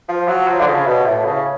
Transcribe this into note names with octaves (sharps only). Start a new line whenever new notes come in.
F3
F#3
F3
D3
C#3
B2
A2
C#3